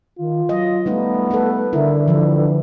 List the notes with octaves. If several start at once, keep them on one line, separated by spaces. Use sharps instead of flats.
D#3 F4
F#3 D#5
G3 A3 B3 D#4 F4
A4 B4
D3 E4 A#4
G2 E3 F3